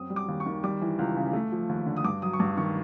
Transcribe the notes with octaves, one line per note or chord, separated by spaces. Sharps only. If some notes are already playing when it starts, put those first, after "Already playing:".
Already playing: F#2 C4 D#6
G3
D6
D#2
C#6
D#3
G3 D6
E3
C#2
C#3
A3
F3
D#2
D3
D#6
G2 D6
F#3 D#6
C#6
G2 D6
D#3 C#6